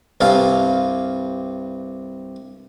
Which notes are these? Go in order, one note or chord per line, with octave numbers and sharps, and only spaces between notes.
C2 G2 A4 F5